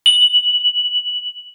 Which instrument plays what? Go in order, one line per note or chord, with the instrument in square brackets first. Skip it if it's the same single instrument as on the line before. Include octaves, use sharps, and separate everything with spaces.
[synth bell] F#7